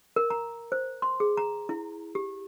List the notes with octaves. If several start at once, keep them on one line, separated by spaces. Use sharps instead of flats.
A#4
A#5
C5
C6
G#4
A#5
E4
G4